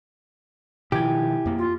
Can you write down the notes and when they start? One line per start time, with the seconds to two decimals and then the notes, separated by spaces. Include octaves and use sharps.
0.92 B2 D#3 F3 E4 G4 G#5 G#6
1.46 F2 A#3
1.58 F4